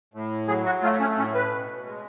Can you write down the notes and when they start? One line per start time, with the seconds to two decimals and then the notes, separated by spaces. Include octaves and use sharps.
0.14 A2
0.48 F#3 G#4
0.66 F#4
0.83 A3 F4
1.00 C#4
1.17 A2 C#4
1.35 B4
1.52 B2
1.87 G#3